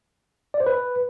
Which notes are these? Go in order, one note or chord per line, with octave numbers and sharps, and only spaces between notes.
D5
C5
B4